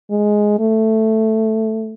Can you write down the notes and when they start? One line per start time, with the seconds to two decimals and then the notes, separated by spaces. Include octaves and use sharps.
0.10 G#3
0.59 A3